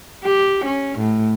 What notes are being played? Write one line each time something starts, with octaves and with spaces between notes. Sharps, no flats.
G4
C#4
A2